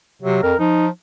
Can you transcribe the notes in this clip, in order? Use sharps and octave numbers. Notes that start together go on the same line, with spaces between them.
C3 F#3
F2 A#4
F3 D#4